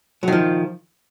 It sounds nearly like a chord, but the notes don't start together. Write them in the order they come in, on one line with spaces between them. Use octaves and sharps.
F#3 D#3 F3